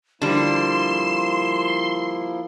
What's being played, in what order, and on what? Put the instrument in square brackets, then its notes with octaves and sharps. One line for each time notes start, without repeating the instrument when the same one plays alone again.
[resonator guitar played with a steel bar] D3 G3 [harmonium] F3 A#3 E4 [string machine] C6 [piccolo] E7